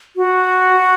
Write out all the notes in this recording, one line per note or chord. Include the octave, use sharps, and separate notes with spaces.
F#4